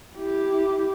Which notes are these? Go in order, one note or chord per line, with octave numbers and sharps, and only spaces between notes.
E4 G4